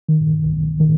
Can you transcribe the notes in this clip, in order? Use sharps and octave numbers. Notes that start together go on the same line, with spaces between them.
D#3
C2
D#3